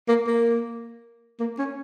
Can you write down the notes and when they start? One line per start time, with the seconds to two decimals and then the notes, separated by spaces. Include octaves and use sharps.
0.08 A#3
0.27 A#3
1.40 A#3
1.59 C#4